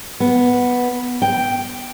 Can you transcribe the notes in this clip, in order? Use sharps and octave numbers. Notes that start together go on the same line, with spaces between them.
B3
G5